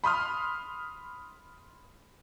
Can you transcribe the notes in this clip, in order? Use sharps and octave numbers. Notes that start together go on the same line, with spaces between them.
B5 C6 D#6 F6